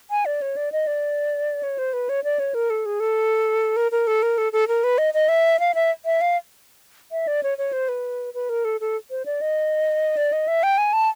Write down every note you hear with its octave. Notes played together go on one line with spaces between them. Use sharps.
G#5
D5
C#5
D5
D#5
D5
C#5
C5
B4
C#5
D5
C#5
A#4
A4
G#4
A4
A#4
A#4
A4
A#4
A4
A4
A#4
B4
D#5
D#5
E5
F5
E5
E5
F5
E5
D5
C#5
C#5
C5
B4
B4
A#4
A4
A4
C5
D5
D#5
D5
D#5
E5
G5
G#5
A5